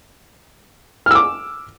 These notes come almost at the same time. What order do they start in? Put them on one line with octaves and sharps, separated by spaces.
F6 E6 D6